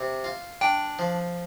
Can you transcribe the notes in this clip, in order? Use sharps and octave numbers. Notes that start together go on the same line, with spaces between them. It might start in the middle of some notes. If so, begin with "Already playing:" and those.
Already playing: C3
F4
D4 G5
F3